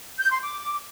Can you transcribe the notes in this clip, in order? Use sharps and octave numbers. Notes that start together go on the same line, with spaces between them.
G6
C6
D6